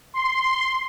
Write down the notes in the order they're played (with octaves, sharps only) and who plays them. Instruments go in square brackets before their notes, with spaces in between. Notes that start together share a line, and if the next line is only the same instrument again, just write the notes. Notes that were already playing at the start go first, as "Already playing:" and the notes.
[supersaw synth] C6